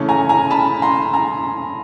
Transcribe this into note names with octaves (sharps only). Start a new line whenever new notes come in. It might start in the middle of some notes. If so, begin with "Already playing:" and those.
Already playing: C#3 E3 A3 C#4
G#5 A#5
G#5 A#5
A5 B5
A#5 C6
G#5 A#5